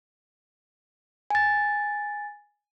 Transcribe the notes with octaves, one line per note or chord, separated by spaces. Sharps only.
G#5 A6